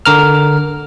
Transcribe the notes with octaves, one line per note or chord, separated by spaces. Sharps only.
D3 A#4 F6